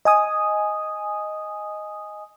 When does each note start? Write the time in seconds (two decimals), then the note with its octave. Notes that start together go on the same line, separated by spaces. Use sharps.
0.05 D#5 G#5 D#6